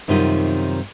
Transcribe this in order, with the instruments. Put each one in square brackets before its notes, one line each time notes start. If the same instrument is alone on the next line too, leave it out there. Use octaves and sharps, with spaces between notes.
[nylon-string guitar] F#2 C3 D#3 G3 D#4 F4